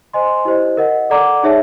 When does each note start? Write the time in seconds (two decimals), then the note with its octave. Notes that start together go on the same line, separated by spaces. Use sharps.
0.13 C5 D#5 G#5 C6
0.45 E4 G4 C5 D#5
0.77 A#4 D#5 F#5
1.10 A4 D5 F#5 A#5 D6
1.43 D#4 G#4 C#5 E5 A5